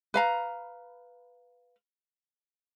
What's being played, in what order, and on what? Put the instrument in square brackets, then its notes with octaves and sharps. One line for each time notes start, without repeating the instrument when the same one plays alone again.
[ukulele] B4 F5 A#5